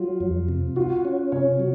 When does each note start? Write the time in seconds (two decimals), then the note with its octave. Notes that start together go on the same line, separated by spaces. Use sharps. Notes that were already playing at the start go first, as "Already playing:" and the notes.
Already playing: F#3 F4
0.20 F2
0.49 C3
0.76 F4 F#4
1.05 C#4
1.32 C3 C#5
1.59 F#3